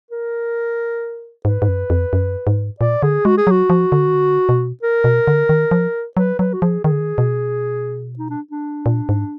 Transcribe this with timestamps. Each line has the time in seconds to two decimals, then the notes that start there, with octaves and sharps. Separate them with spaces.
0.11 A#4
1.45 G#2 B4
1.62 G#2
1.68 F#2
1.90 F2
2.13 F#2
2.47 G#2
2.80 A#2 D5
3.03 D3 G#4
3.25 G#3 F#4
3.38 G#4
3.47 F#3 F#4
3.70 F3
3.92 D3
4.07 D#3
4.14 D3
4.49 B2
4.83 A#4
5.04 B2
5.27 D3
5.49 D#3
5.71 F3
6.17 F#3 B4
6.39 F#3 B4
6.53 F#4
6.62 F3 G#4
6.84 D#3 G#4
6.91 D3
7.00 D#3
7.18 B2
8.19 D#4
8.30 D4
8.51 D4
8.86 A#2
9.09 G#2